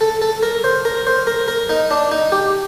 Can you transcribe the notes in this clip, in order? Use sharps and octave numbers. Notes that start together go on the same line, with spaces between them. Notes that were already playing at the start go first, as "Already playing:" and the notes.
A4
A4
A#4
C5
A#4
C5
A#4
A#4
D#4
D4
D#4
G4